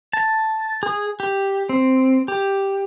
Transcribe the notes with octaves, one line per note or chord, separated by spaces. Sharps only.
A5
G#4
G4
C4
G4